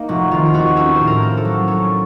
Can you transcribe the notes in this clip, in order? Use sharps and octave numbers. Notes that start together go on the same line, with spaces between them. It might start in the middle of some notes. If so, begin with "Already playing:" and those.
Already playing: A#3 D#4
F1 F#4
D#3 F4
F4
D#2 F#4
C#4 A4
A2 C5
A#4
A#3
A4
F#3
C#4 A4